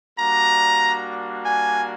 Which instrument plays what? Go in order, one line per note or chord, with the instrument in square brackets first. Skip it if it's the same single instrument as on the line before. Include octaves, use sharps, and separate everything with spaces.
[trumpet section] G3 A#3 D4 F#4 A#5
G#5